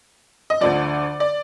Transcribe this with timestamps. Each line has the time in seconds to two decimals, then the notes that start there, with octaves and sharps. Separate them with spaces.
0.50 D#5
0.61 D2 D3 F3 D5
1.20 D5